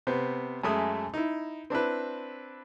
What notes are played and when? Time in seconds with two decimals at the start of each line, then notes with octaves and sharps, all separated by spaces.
0.07 C3 B3 C5
0.64 F#2 G#3 A3 E5 D#6
1.14 D#4 E4
1.70 C4 D4 E4 B4